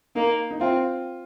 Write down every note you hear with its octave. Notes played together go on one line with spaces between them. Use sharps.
A#3 D#4
D#4
C4 F4